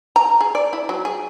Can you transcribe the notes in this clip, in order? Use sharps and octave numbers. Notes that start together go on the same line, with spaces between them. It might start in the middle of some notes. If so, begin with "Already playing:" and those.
A#5
G#4
D5
E4
F#3
G#4